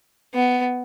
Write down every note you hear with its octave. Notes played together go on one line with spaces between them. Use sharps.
B3